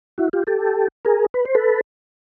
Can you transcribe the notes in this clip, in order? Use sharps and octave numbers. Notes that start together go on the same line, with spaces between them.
E4 F#4
F4 G4
G4 A4
G#4 A#4
B4
C5
A4 B4